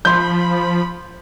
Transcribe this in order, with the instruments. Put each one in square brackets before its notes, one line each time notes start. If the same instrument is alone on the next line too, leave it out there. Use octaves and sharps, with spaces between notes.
[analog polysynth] F3 B5 [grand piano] C6 G6